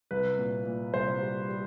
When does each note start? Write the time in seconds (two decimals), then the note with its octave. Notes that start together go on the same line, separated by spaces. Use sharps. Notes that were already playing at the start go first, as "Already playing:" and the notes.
0.11 C2 B4
0.38 A#2
0.66 A#2
0.94 C2 C5
1.21 G3
1.49 G3